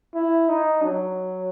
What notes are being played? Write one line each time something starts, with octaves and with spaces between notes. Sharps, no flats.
E4
D#4
F#3